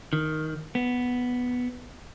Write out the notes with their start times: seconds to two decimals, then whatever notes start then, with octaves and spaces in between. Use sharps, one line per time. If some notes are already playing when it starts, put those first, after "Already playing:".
0.13 D#3
0.75 B3